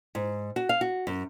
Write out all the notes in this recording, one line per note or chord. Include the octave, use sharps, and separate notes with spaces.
G#2
F#4
F5
F#4
F#2